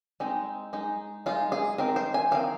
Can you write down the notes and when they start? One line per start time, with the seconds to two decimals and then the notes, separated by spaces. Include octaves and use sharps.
0.20 G#3 C4 D#4
0.73 G#3 D#4
1.26 G#3 D#4 F4
1.52 G#4
1.78 D#3 C4 D#4 A#4
1.96 C5
2.14 G#5
2.31 D#3 C4 D#4 F5